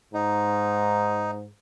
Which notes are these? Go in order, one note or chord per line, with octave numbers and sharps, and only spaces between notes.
G#2 D#4